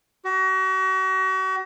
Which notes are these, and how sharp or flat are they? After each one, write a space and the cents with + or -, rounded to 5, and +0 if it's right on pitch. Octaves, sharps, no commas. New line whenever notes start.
F#4 +40